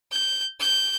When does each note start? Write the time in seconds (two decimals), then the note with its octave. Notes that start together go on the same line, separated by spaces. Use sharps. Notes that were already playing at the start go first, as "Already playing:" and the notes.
0.12 G6
0.60 G6